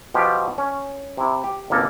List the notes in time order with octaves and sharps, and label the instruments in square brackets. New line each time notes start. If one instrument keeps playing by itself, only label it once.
[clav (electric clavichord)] B2 F3 G4
C#4
C3 E4
G4
G#1 C#2 A#3 A4